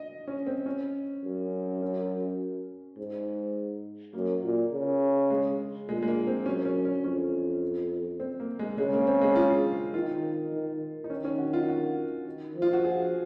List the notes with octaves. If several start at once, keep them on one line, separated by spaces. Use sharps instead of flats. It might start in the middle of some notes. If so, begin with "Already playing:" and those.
Already playing: D#5
C#4
C4
C#4
F#2
C#4
G#2
F#2 A#3
A#2
C#3
G#3
A#2 G#3
G#3
A#3
C4
F#2 C#4
C#4
C#4
F2 C#4
C4
A#3
G#3
C#3 G#3
A#3
C4
G#3
F4
D#3 F4
D#3
D#4
D#3 C#4
C#4
F#4
F4
F#4
D#3
F3
F4
F#4
G#4